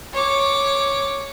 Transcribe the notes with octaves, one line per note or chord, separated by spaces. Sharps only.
C#5 D6